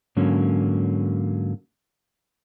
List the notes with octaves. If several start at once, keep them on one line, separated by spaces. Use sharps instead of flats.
G#2 D3 F#3 A#3 C#4